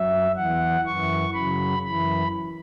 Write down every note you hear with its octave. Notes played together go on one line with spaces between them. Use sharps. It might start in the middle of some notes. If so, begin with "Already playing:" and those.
Already playing: F#2 F#3 E5
E2 E3 F#5
F#2 E3 C#6
F#2 C#3 F#3 B5
F#2 E3 B5